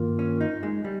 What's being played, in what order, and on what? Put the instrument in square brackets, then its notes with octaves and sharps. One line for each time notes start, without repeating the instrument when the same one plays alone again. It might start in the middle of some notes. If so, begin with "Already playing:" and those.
Already playing: [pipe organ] G2 D#3 A#3 F4 A#4
[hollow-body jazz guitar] C#4
D#4
G#3
G3